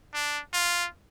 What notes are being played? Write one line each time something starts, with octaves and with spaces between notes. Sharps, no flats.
D4
F4